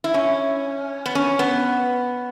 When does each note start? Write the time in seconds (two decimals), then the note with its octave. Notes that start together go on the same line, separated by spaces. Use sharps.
0.04 E4
0.14 C#4
1.06 B3
1.15 C#4
1.39 B3